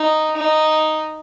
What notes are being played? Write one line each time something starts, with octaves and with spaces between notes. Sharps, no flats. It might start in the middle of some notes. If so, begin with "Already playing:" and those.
Already playing: D#4
D#4